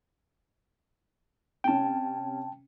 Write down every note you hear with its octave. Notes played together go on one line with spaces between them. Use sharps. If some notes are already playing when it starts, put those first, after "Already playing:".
C3 C#4 G5 A5